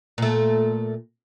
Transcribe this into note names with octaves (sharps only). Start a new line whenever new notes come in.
A#2 A3